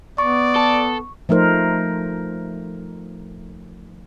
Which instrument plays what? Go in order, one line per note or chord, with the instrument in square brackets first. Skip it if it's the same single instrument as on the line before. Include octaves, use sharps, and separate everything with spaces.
[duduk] B3 [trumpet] D5 [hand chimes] C#6
[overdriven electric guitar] A4
[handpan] F3 A3 D#4 A#4 C5